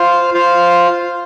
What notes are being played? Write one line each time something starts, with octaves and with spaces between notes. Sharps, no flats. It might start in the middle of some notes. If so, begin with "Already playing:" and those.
Already playing: F4 C5 F5
F4 C5 F5